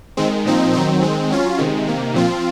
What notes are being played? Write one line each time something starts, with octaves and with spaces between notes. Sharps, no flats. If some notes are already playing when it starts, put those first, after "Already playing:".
D#3 G#3 C4
A#2 F3 C4 D#4
D#3 F#3 C4 D#4
D#3 G#3 C4
F#3 C#4 F4
C3 D#3 G#3
C3 D#3 A#3
A#2 F3 C4 F4